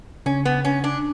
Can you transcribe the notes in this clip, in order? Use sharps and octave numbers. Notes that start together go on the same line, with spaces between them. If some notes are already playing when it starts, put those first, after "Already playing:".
C#3 C#4
B3
C#4
D4